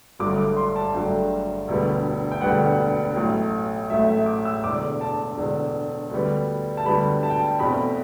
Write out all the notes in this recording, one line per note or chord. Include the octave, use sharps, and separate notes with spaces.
G1 G2 D3 F#3 A3 D6
D6
C6
A5
G1 G2 D3 F#3 A3 G5
E1 D2 D3 G3 B3
G5
E1 D2 D3 G3 B3 F#5
A1 A2 F#3 A3
A1 A2 F#3 A3 E5
E5
D6
E6
E1 E2 D3 D6
A5
E1 E2 D3
D2 D3 G3 B3
A5
D2 D3 G3 B3 B5
A5
G5
A5
E2 B2 A3 C4 B5